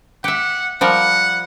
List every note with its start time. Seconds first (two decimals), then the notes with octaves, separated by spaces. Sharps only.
0.24 G4 E5 F#5
0.81 F3 G3 A#4 F#5